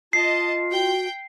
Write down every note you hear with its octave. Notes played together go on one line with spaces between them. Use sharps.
F4 D#5 A5 C7
F#4 G5